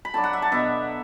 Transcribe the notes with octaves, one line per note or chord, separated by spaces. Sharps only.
B5
D3 F#3 D4 A5
F#5
E5
A5
B2 B3 D4 E5